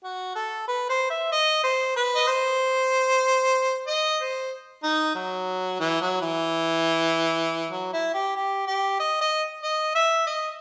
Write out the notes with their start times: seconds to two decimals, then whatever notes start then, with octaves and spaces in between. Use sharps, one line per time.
0.04 F#4
0.35 A4
0.68 B4
0.89 C5
1.10 E5
1.32 D#5
1.63 C5
1.96 B4
2.15 D#5
2.27 C5
3.87 D#5
4.19 C5
4.83 D#4
5.15 F#3
5.80 E3
6.01 F#3
6.22 E3
7.71 F#3
7.93 E4
8.14 G4
8.36 G4
8.67 G4
9.00 D#5
9.21 D#5
9.63 D#5
9.95 E5
10.27 D#5